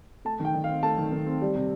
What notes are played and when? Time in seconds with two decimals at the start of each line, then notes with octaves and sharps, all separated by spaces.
0.25 A3 A5
0.40 D#3
0.45 G5
0.54 D#3
0.64 F5
0.68 C4
0.83 A3 A5
0.98 D#3
1.12 D#3
1.26 C4
1.42 G3
1.55 C3